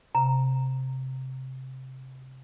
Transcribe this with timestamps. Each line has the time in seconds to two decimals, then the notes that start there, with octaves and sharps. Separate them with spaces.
0.15 C3 A#5